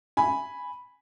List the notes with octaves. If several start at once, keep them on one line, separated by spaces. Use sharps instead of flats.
G#5 B5